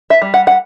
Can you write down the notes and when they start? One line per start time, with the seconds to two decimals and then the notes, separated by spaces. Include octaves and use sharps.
0.10 E5
0.22 G3
0.34 F#5
0.47 F#5